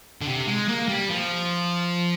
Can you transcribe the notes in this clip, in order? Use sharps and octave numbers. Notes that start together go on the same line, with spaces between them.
D3
C3
G#3
A#3
G3
F3